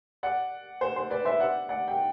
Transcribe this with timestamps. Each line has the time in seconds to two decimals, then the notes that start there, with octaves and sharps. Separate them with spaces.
0.23 D5 F#5
0.81 C5
0.96 C5
1.10 B4 D5
1.25 C5 E5
1.40 D5 F#5
1.69 D5 F#5
1.88 G5